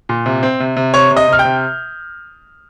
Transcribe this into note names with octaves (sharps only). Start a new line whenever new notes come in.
A#2
C3
C4
C3
C3
C3 C#5 C#6
C3
D#5 D#6
C3 F6
G5 G6
C3